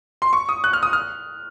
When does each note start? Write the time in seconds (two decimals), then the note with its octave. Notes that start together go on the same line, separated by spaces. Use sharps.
0.22 C6
0.33 C#6
0.49 D#6
0.64 F#6
0.73 F6
0.83 D#6
0.93 F6